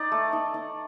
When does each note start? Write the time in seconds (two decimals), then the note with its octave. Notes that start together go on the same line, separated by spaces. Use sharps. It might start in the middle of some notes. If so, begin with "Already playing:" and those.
Already playing: D#4 D5
0.12 A3
0.33 D#4
0.54 D#4